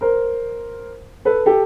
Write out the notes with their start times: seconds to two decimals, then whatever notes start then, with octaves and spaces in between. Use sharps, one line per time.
0.01 A#4 C5
1.25 A4 B4
1.46 G4 A4